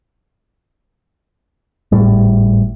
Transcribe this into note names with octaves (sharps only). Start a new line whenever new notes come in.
G#1 A2 G3